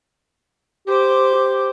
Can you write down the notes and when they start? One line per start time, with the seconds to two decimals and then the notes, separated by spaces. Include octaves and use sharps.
0.88 G4 C5 D6
1.35 G4